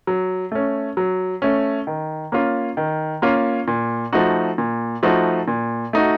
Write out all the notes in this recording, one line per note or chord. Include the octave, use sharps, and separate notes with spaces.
F#3
A3 C#4
F#3
A3 C#4
D#3
A#3 C#4 F4
D#3
A#3 C#4 F4
A#2
F3 A3 D#4 F#4
A#2
F3 A3 D#4 F#4
A#2
A3 D#4 F#4